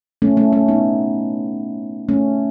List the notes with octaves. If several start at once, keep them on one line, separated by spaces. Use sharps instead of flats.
A3 C#4
A3 C#4
A3 C#4
B3 D#4
A3 C#4